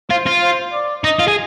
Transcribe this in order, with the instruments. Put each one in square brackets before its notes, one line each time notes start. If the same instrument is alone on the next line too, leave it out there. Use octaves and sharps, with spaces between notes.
[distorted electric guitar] F4 [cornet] C5
[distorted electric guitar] F4
[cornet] C5
D5
[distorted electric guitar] D#4 [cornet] D#5
[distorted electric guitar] F4
G#4